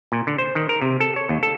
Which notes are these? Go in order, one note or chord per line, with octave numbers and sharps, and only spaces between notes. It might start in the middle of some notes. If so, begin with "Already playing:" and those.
A#2
D3
C5
D#3
A#4
C3
A4
C#5
D#2
A4